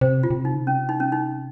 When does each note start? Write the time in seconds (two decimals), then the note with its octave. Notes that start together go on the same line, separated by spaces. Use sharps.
0.01 C3 C5
0.23 F4
0.31 C3
0.45 D#4
0.54 C#3
0.60 C3
0.67 C#4
0.89 D#4
1.00 C#4
1.12 D#4